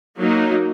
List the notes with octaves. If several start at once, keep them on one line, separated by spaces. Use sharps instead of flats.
F#3 A#3 D#4